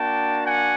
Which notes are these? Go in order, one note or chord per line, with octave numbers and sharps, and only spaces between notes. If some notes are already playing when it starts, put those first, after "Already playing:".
Already playing: A#3 D4 F#4 G5 A5
F#5 G#5